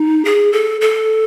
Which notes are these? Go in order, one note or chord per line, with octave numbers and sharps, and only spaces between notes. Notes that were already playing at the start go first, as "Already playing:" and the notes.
Already playing: D#4
G#4
A4
A4